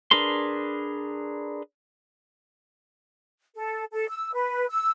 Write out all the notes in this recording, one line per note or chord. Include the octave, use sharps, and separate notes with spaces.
D4 G#4 A#4 B4 C6
A4
A4
E6
B4
E6